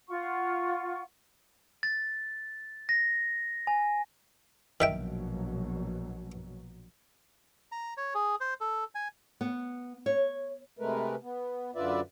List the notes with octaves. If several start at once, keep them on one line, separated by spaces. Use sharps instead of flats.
F4 F#5 C#6
A6
A#6
G#5
A#1 B2 D#3 F#3 E5 G5
A#5
C#5
G#4
C5
A4
G#5
B3
C#5
C3 G#3 A3 A#4 B4
B3
F#2 D3 F4 B4 D5 E5